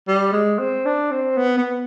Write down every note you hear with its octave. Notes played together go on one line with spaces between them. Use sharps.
G3
G#3
C4
D4
C4
B3
B3